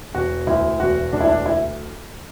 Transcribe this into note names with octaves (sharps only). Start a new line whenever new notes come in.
E1 F#4
D2 E4
E1 F#4
D2 D4
E4
D4
E4